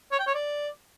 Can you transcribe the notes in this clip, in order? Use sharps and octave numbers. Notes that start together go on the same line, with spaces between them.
C#5
G5
C#5
D5